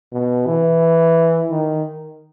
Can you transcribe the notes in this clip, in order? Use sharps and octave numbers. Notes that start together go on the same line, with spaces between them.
B2
E3
D#3